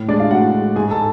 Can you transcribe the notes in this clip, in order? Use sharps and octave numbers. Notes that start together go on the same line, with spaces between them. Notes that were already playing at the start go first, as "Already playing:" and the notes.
Already playing: A2
G#3 D4 D5
F4 F5
A2 F#4 F#5
G#3
G#2 G#4 G#5
A4 A5